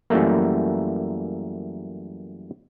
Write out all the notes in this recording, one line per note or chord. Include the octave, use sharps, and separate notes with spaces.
F#2 E3 G3 A3 A#3